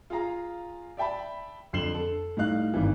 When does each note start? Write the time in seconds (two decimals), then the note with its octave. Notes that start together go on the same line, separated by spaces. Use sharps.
0.10 F4 G#4 F5 A#5
0.97 D5 E5 G5 A5 B5
1.73 F2 D3 C7 E7 F#7 G7
1.94 A4
2.37 A2 G3 D#4 F5 F#6
2.74 G#1 G2 D#3 E3